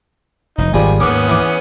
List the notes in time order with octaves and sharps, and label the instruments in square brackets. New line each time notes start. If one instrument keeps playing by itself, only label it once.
[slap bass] F1 [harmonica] D#4
[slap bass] G#1 C3 D#3 [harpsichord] C#2 G3 [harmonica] F3 G#5
[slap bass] D#2 G#2 D#3 [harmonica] B3 C#4 D#6 [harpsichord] D6
[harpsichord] E3 C#6 D6